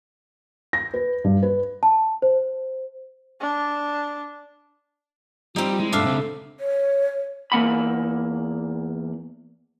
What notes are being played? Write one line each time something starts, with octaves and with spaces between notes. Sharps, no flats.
A#6
B4
G2
B4
A5
C5
D4
G3 C4 D#4 F4
G#3 E4
G2 A3 D4 A4 E5 F5
C#2 C4
C#5
E2 A#3 F#5 B5